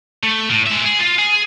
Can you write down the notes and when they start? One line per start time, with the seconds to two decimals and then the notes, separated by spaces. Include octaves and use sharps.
0.24 A3
0.51 A2
0.67 G#3 E5
0.86 G#4
1.00 F4
1.19 G#4